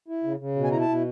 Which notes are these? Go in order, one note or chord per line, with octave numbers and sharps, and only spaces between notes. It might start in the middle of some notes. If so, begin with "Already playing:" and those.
E4
C#3
C#3
B2
G#5
E4 A#5
A5
B2